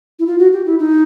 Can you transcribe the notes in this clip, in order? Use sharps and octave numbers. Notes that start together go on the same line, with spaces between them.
E4
F4
F#4
G4
E4
D#4